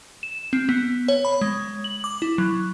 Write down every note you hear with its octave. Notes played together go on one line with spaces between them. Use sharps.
E7
C4
B3
C#5
B5
G#3
F#7
D6
E4
F#3